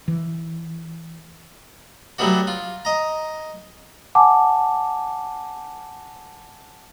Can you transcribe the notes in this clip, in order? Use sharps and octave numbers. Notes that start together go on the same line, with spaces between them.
E3
F#3 G3 A3 B3 D4 F#4
F4
D#5 A#5
F#5 G#5 A5 D6